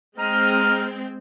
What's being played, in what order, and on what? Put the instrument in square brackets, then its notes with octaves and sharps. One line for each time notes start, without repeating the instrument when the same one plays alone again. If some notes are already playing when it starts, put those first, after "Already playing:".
[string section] G#3 C4 [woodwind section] D#5 A#5 F6